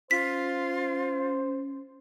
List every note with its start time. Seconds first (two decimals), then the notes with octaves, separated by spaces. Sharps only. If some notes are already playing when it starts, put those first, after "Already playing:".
0.11 C#4 F4 C5 B6